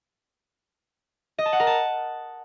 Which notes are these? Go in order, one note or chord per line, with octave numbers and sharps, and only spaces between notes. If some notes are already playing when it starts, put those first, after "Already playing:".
D#5
A5
F#5
A#4
A5